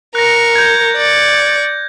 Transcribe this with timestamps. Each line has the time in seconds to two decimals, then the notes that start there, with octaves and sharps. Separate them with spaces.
0.15 A#4 C#6 F#6 A#6
0.56 G6 G#6
0.97 D5 C#6